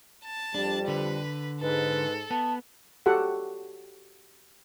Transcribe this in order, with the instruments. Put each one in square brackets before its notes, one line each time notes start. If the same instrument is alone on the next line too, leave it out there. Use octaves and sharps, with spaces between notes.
[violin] A5
[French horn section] F2 G3 [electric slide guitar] D4
[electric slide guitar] D3 [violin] B4
[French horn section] G#2 [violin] A4 [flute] B4
[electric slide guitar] B3 [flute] A5
[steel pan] F#4 G4 A4 F#5